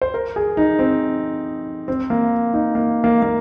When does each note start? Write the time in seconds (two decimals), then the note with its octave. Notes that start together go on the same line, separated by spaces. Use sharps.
0.02 C5
0.14 A#4
0.36 G#4
0.57 D#4
0.79 C4
1.88 C4
2.10 A#3
2.53 D#4
2.75 A#3
3.04 A#3
3.22 A#3